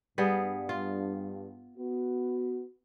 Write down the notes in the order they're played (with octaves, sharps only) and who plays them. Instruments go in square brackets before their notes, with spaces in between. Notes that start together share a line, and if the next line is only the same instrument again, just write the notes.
[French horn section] G2 [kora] G3 B3 G#4
[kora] F4
[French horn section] B3 F#4